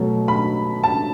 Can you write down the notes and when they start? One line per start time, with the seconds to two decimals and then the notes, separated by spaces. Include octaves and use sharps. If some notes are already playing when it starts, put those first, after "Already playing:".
Already playing: B2 F#3 A3
0.28 B5
0.84 A5